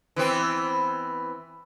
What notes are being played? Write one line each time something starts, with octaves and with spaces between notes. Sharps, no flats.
E3 B3 C4